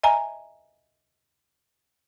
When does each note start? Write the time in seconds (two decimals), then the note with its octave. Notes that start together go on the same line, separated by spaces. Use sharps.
0.04 D#5 E5 G#5 A#5